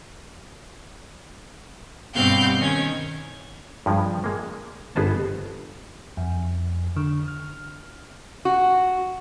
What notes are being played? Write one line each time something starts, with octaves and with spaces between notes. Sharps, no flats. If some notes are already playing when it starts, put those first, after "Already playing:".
G2 B2 B3 C4 F5 G6
D#3 C#4 G#6
G2 F3 G#3
G#3 A#3
G1 B3 G#4 C5 D#5 A5
F2
D3
F6
F#4